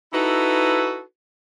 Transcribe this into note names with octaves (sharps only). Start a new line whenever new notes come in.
D#4 E4 F#4 A4 B4